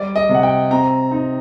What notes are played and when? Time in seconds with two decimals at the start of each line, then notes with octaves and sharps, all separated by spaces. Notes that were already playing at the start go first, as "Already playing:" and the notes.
Already playing: G3 D5
0.16 D#5
0.29 C3
0.35 F#5
0.43 G5
0.71 C4 A#5
1.11 D#4